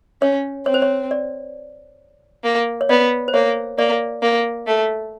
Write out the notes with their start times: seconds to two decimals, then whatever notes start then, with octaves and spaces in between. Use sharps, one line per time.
0.22 C#4 C#5
0.66 C4 C#5
0.74 C5
0.82 C#5
1.11 D5
2.44 A#3
2.81 C#5
2.89 B3 D5
3.28 C5
3.34 A#3 C#5
3.78 A#3 D5
4.23 A#3
4.67 A3